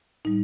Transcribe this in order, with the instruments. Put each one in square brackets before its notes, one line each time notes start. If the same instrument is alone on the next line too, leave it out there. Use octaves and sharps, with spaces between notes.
[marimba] A2 G3 D#4